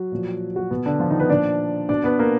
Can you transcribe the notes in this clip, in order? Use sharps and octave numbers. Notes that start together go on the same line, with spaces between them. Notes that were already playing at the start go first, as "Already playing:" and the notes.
Already playing: F#3 F#4
A#2 F3
F#3 F#4
B2 B3
D3 D4
F3 F4
D#3 D#4
B3 B4
A#2 F3 D4 D5
B2 D4 D5
B3 B4
A#3 A#4